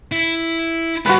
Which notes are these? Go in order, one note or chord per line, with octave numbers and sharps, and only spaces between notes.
E4
G3 F4 F#4 B4